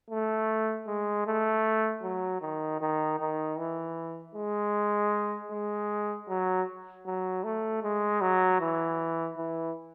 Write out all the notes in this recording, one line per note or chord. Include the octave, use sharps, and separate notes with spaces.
A3
G#3
A3
F#3
D#3
D#3
D#3
E3
G#3
G#3
F#3
F#3
A3
G#3
F#3
E3
E3